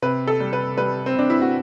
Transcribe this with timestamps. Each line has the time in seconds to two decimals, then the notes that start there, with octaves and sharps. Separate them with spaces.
0.02 C3 B4
0.27 A4
0.40 G3
0.53 B4
0.78 G3 B4
1.06 C4
1.16 C3 D4
1.30 E4
1.42 F#4